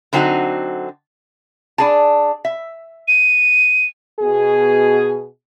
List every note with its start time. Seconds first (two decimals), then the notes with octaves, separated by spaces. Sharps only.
0.13 D3 F#3 C4 D#4 F#4
1.78 D4 G#4 A5
2.45 E5
3.08 D#7
4.20 B2 G#4